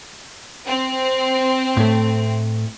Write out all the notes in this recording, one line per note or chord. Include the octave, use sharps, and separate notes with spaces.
C4
A2 A3